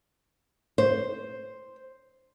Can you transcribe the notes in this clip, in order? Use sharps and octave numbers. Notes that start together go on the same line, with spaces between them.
C5